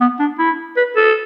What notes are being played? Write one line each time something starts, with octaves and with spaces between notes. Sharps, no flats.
B3
D4
E4
B4
A4